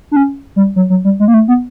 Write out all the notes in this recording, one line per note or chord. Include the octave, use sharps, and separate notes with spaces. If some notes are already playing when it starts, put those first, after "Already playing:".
D4
C#4
G3
F#3
F#3
G3
G#3
A#3
A3
B3